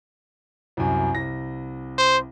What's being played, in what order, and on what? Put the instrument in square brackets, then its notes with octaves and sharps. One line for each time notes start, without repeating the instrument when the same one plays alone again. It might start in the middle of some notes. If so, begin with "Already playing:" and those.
[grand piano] C2 F#2
C2 A#6
[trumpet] C5